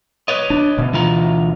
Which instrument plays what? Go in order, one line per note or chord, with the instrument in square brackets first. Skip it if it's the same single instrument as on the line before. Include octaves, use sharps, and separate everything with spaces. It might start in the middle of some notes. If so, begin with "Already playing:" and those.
[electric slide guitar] B4 C#5 D#5
[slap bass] D4
D2 B2
[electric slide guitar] E3 F4 A#5